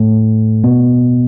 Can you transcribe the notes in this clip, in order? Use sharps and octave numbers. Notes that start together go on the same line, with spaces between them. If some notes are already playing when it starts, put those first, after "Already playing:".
Already playing: A2 A3
B2 B3